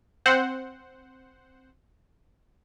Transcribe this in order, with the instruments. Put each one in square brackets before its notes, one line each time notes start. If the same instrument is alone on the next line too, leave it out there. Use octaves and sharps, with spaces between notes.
[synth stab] C4 C5 F#5